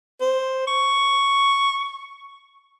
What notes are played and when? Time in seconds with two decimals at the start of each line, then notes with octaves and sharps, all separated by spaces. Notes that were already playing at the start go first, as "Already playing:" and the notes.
0.21 C5
0.67 C#6